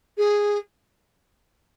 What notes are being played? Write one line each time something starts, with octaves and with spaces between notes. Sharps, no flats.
G#4